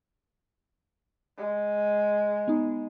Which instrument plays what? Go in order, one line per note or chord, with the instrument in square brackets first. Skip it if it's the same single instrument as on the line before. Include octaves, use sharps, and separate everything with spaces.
[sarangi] G#3
[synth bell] B3 D#4